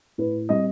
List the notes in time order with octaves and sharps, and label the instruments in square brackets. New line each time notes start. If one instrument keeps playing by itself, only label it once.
[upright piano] A2 B4
G3 C4 D#5